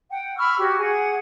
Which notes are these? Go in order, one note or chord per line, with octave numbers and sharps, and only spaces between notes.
F#5 G5
B5 C#6 E6 F6
F#4 G4 C#5
G#4 F#5